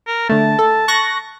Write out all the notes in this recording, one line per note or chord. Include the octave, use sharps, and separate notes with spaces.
A#4
D3 A3 A5
A4
C#6 F#6 A#6